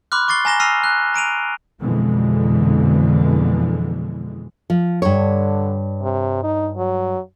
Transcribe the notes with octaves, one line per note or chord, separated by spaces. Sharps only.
B5 C6 D6 F6 F#6
C#6 D6 A6 C7 G7
G#5 A#5 A#6 E7 G7
E6 F6 A#6 C7 D#7 F7
F#6
A#5 D7 D#7 F7
F2 B2 D3 E3 G#3
F3
G2 D3 C#5
C3
D#4
F#3